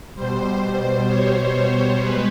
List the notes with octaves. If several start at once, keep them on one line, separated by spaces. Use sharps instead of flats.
B2 G3 C5
C#5
C5
G#3 B4